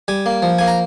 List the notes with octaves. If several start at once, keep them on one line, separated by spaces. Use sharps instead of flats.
G3 G#5
A#3
F3
A#3 G#5
A#5